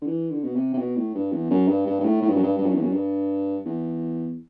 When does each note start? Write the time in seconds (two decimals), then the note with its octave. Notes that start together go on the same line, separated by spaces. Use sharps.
0.02 D3
0.07 E3
0.31 D3
0.44 B2
0.55 C3
0.74 C3
0.78 B2
0.96 A2
1.15 G2
1.32 E2
1.51 F#2
1.68 G2
1.87 G2
2.00 G2
2.05 A2
2.22 A2
2.29 G2
2.36 F#2
2.43 G2
2.58 G2
2.66 F#2
2.74 E2
2.82 F#2
2.94 G2
3.66 E2